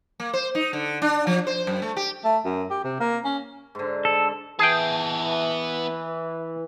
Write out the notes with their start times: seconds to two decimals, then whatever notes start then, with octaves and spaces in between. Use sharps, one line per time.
0.20 A#3
0.33 C5
0.55 D#4
0.73 D3
1.02 D4
1.27 F3
1.47 C5
1.67 F#2
1.82 A3
1.97 G4
2.24 A3
2.44 F#2
2.70 G4
2.84 C3
3.00 A#3
3.24 C#4
3.75 G#2 D3
4.05 A4
4.59 E3 B3 G#4 G5 A5